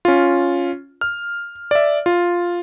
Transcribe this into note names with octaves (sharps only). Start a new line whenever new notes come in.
C#4 F4
F6
D5 E5
F4